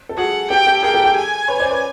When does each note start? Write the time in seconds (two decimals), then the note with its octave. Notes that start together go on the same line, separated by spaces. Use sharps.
0.09 A4
0.17 F#4 G#4 F#5
0.50 G4 A4 G5
0.66 G4 A4
0.83 G#4 A#4 G5
0.94 G4 A4
1.04 G4
1.16 G#5
1.48 B4 C#5
1.59 C5 D5
1.71 B4 C#5